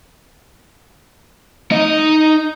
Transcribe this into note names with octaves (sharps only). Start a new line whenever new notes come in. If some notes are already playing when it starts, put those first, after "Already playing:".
D#4 D#5